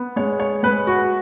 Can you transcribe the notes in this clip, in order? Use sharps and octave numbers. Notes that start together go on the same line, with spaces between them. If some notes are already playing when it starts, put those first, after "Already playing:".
Already playing: B3
G#3 C#5
C#5
G#3 B4
F#4